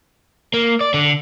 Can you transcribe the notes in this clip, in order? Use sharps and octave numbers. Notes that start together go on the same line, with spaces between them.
A#3
D5
D3